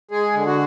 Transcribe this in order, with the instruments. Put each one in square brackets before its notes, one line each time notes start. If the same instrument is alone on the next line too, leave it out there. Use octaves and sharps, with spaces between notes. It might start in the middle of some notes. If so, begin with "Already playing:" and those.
[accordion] G#3 G#4
D3
F#4